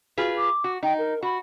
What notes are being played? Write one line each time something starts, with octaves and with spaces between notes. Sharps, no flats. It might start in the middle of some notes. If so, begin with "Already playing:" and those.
F4 F#4 G#4 B4
D6
F#4
D#4 G5
A#4
F#4 B5